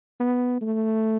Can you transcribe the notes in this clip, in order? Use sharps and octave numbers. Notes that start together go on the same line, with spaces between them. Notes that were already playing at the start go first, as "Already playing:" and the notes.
B3
A3